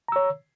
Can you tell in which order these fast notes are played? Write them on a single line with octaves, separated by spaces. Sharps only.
A#5 E6 C#5